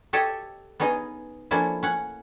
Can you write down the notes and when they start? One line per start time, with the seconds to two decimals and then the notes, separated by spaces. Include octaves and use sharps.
0.13 G4 A4 C#5 D#5
0.80 B3 C#4 D#4 G#4 D#5
1.51 F3 A3 A#3 C#4 D4 E4
1.83 C#4 F#5